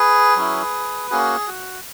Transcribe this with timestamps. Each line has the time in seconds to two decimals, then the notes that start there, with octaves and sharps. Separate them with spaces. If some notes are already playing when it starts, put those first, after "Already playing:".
Already playing: G#4 B4
0.36 F#3 C#4 E4
1.10 A#3 C#4 F#4 G#4
1.47 F#4